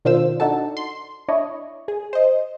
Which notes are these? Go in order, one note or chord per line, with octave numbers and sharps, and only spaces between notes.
B2 D#3 D4 F4 C5 E6
D4 D#4 F#4 A4 A5
C6
D4 E4 C#5 D#5
G#4
C5 D#5